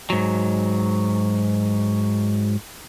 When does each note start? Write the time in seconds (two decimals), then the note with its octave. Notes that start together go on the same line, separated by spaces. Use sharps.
0.10 G#2 F#3